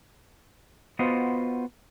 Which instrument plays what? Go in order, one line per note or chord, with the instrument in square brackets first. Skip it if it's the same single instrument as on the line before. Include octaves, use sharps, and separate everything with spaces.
[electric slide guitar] B3 F4 F#4 C5 D#5